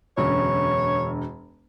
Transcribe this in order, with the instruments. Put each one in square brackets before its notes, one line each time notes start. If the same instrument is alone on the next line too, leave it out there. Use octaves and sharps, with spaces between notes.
[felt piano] E1 F#2 D3 [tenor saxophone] C#5